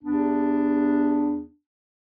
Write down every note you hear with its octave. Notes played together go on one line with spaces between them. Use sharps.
E2 C3 B3 D4